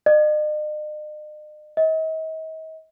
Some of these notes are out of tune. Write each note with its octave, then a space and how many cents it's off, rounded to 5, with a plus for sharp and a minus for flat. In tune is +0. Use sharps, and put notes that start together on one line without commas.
D#5 -45
D#5 +40